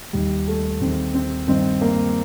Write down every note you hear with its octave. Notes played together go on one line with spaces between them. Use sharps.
D#2 D#3 G3
A3
D#2 D#3 C4
C4
G2 D#3 C4
A#3